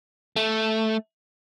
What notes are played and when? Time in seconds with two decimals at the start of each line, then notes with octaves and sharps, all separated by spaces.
0.36 A3